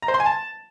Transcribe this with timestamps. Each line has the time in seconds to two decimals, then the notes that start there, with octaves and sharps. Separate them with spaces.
0.02 A#5
0.08 C5
0.14 C6
0.20 G#5
0.26 A5